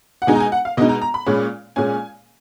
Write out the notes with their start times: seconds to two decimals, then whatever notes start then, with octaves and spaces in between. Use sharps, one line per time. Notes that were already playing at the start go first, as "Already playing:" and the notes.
0.22 F#5
0.27 B2 G#3 D#4 G#5
0.35 A#5
0.40 G#5
0.52 F#5
0.65 F5
0.77 B2 G#3 D#4 D#5
0.89 A#5
1.02 A#5
1.14 B5
1.26 A#2 G#3 C#4
1.76 A#2 G#3 C#4 G#5